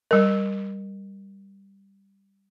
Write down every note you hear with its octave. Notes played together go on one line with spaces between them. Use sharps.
G3 A#4